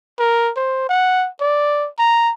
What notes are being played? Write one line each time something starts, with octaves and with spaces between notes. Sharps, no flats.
A#4
C5
F#5
D5
A#5